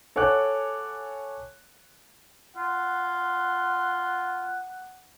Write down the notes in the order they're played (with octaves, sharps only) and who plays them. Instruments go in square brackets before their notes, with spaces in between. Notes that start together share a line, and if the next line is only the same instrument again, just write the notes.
[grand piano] A4 C#5 F#5 G#5 D6 F#6
[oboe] F4 [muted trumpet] F#5